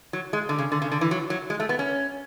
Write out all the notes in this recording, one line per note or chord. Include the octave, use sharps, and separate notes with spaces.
F#3
G#3
D3
C#3
D3
C#3
D3
E3
F#3
F#3
G#3
A3
B3
C#4